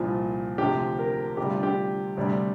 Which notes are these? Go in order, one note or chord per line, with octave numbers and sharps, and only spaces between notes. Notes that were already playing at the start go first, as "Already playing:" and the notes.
Already playing: C2 A#2 F3
D2 C3 F3 G4
A#4
D2 C3 G3 G4
F4
G4
D2 C3 G3